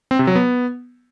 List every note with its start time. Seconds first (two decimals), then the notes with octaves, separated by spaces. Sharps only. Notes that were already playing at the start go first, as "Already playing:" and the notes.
0.11 C4
0.19 C3
0.27 F#3
0.36 B3